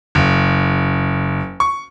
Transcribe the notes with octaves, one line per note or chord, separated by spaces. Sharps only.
F#1
C#6